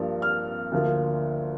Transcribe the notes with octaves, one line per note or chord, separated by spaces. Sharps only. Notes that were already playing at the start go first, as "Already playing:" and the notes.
Already playing: G2 F3 A#3
F6
D2 D3 F3 A#3